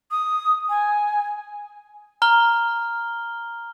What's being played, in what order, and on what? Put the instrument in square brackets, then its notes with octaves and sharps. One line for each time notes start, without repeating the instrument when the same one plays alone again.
[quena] D#6
G#5
[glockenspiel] A#5 F6 G7